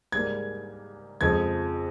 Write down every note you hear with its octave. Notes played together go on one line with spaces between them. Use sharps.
G#2 G3 A#3 G#6
F2 C#3 F3 G#3 G#6